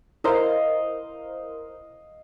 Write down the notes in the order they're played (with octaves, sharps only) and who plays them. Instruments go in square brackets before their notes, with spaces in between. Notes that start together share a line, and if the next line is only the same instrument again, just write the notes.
[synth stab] E4 A#4 C5 [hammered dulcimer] D#5 F5